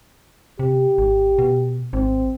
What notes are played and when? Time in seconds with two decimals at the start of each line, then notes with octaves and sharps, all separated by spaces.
0.59 C3 G4
0.98 G#1
1.39 B2
1.93 G#1 C4